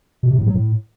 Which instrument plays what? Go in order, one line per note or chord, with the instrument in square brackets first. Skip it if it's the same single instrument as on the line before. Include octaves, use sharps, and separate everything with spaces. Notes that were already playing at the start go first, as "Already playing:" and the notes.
[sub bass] B2
C3
A2
F#3
A2